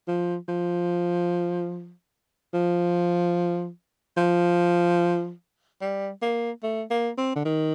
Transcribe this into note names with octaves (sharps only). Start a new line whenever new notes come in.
F3
F3
F3
F3
G3
A#3
A3
A#3
C4
D3
D#3